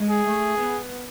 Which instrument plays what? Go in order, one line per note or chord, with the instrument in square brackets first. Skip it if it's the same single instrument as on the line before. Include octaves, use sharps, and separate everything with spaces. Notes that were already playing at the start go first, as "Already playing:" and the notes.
Already playing: [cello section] G#3
[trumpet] G#4
[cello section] A3
B3